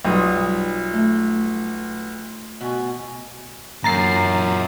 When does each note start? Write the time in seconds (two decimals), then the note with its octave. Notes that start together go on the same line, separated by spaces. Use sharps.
0.05 B1 G3 F4 D#6
0.93 A3
2.61 B2 G#5
3.84 F#2 A#2 F#3 A#5 A6 C7